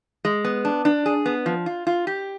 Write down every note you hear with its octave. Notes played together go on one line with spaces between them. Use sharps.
G#3
B3
D4
D4
G#4
B3
F3
F4
F4
G4